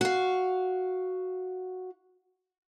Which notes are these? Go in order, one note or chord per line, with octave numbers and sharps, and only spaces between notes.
F#4 F5